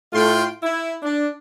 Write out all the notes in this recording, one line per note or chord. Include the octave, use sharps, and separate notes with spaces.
A2 A3 F4 G5 C6
E4
D4